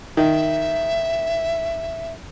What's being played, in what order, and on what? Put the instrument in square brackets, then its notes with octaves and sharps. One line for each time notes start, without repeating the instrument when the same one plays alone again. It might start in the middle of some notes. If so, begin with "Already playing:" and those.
[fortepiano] D#3 [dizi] E5